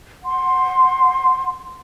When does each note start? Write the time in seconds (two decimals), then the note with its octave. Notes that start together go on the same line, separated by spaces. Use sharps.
0.25 F#5 C6